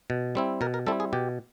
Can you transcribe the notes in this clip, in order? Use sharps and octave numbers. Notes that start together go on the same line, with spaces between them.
B2
G3 C4 E4
B2 A#4
A#4
G3 C4 E4 A4
G#4
B2 G4